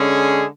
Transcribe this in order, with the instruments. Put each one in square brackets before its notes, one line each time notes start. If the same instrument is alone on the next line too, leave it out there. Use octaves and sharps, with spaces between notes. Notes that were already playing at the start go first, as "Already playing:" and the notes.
Already playing: [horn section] D3 G#3 C#4 G#4